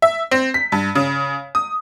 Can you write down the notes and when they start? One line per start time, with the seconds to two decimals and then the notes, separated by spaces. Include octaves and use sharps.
0.02 E5
0.31 C4
0.54 B6
0.72 G2
0.95 C#3
1.55 D#6